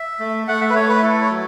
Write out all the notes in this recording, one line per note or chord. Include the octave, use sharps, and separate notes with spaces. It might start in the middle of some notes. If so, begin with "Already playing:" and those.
Already playing: E5
A3
A3 F#5
E5
B4
A3 C#5
B4
E4 A4
C#5
F#3